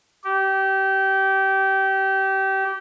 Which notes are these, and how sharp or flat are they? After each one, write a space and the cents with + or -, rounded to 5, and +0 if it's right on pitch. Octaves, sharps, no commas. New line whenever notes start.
G4 -25